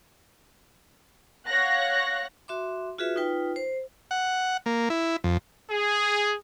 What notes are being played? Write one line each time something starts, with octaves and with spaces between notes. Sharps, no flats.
C#5 F5 F#5 F#6 A#6
F#4 E5 C6 D6
F4 F#4 G#4 B4 E5
D#4 F4 B4 G5
C5
F#5
A#3
E4
F2
G#4